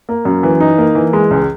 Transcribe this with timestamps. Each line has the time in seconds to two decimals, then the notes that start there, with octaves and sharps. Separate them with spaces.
0.09 A#3
0.25 F#2
0.43 E3
0.60 D#4
0.78 A#3
0.95 E3
1.13 G#3
1.31 C#2